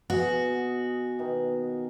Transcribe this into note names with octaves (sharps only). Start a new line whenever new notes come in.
B2 F#4 G#4
B2 D#3